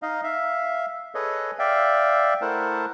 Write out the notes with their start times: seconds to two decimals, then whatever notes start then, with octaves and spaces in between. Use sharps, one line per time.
0.02 D#4 D#5 F5
0.24 E5 F5
1.15 G#4 A4 B4 C#5 D#5
1.59 D5 E5 F5 G5
2.42 A3 E4 A#4 C5 F#5 A5